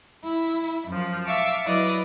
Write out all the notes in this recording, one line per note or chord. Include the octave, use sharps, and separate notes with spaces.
E4
F#2 F3
E5 F5 A5 C#6 D6
F#3 E4 B4 D5 D#5 F5